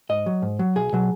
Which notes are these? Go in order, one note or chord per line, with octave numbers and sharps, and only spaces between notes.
G#2 D#5
F#3
G#2
F#3
B1 G#4
B2 F#3